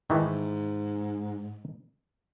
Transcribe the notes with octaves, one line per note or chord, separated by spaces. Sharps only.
G#2 D#3 E3 A3